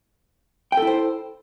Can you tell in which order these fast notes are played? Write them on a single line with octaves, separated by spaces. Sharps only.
G5 A4 E4 C5